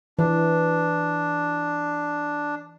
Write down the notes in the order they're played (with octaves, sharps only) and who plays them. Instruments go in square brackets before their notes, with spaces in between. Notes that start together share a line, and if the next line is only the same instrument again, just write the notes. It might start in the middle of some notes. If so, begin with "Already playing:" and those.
[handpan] E3 [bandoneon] D4